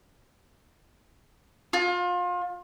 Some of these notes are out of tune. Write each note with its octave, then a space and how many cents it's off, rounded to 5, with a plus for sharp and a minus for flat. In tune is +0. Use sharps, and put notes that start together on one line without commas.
F4 +30